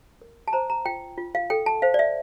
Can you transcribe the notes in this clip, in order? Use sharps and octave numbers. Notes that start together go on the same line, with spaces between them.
A#4
A5
C5 A#5
A#5
F4 G5
F4
F5
A4 G5
A5
C5 F5
D5
E5